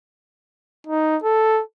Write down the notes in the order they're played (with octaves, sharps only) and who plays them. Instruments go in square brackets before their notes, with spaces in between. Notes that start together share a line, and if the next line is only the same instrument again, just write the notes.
[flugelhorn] D#4
A4